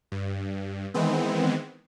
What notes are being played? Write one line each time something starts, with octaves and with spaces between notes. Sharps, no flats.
G2
D#3 E3 G#3 B3 C4